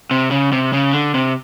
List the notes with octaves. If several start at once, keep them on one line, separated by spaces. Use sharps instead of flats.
C3
C#3
C3
C#3
D3
C3